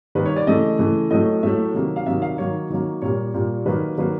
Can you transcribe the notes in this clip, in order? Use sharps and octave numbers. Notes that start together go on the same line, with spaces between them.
D#3 G3 A#3 B4
C#5
D5
C#3 E3 A3 D#5
C#3 E3 A3
A2 F#3 A3 D#5
A2 F#3 A3 E5
C3 D#3 F#3 A#3
F5
C3 D#3 F#3 A#3 E5
F5
D#3 F#3 A#3 C#5
D#3 F#3 A#3
A#2 G3 A#3 C#5
A#2 G3 A#3
D#3 F#3 A#3 B4
D#3 F#3 A#3 B4